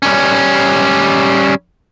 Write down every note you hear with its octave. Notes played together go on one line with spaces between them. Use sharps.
G3 C#4